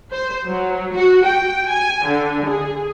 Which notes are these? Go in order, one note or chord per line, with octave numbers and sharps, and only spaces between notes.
C5
F#3
F#4
G5
G#5
D3
G#4